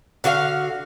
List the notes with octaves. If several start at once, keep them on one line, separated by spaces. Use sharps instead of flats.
D3 F#4 G4 F5